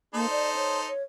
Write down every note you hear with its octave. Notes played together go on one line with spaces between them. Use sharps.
A#3 D#4 A4 C5
D5
C#5
C#5